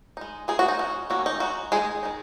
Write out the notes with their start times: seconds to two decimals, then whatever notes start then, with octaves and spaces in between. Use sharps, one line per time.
0.17 G#3 D#4
0.48 G#3 D#4 G#4
0.59 F#4
0.68 D#4
0.79 G#3 C#4 F#4
1.10 D#3 A#3 C#4 F#4
1.26 D#4
1.40 G#3 D#4 F#4
1.72 D#3 G#3 D#4 G#4
2.03 D#3 G#3 D#4